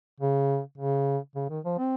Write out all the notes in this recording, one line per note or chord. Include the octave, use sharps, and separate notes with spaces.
C#3
C#3
C#3
D#3
F3
C4